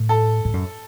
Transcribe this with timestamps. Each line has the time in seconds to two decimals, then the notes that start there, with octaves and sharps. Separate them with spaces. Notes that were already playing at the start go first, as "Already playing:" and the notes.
Already playing: A2
0.09 A4
0.45 A2
0.54 F#2